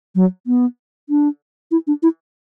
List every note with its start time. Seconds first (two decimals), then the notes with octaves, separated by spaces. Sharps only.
0.15 F#3
0.47 B3
1.09 D4
1.71 E4
1.87 D4
2.03 E4